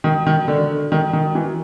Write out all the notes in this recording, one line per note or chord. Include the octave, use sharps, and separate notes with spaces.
D#3
D#3
D3
D#3
D#3
E3